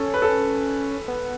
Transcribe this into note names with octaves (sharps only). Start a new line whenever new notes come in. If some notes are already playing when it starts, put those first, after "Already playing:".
Already playing: C#4 A4
B4
A4
B3